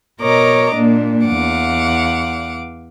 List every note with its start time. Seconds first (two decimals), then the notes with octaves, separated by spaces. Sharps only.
0.20 B2 A#4 C#5 D#5 A#5 D6
0.74 A#2 A#3 D4
1.25 E2 F5 F#5 D6